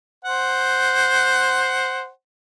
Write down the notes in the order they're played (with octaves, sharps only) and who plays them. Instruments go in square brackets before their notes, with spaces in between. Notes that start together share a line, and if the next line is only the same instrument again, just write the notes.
[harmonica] C5 F#5